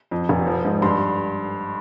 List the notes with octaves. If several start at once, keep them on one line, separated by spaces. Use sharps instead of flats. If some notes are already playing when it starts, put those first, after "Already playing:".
F2
F1
F3
G#2
G2 C6